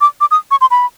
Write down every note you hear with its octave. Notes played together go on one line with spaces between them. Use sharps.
D6
D6
D#6
C#6
C6
B5